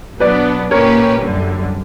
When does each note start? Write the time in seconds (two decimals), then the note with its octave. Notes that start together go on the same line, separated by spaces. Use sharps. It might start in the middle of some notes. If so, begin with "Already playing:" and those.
0.20 B2 F#3 B3 D4 B4 D5
0.71 A#2 A#3 C#4 G4 A#4 B4 C#5
1.22 F#2 D3 G3